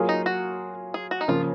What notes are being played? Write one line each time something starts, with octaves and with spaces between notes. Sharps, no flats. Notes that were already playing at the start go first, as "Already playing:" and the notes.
Already playing: F#3 A#3 F4 G#4
D#4
F#4
G#4
F#4
D#4
C#3 F3 A#3 F4